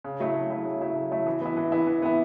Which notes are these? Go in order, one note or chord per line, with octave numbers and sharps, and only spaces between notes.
C#3
F#3 A3 E4
C#3
F#3 A3 E4
C#3
F#3 A3 E4
C#3
F#3 A3 E4
E3
B3 E4
E3
B3 E4
E3
B3 E4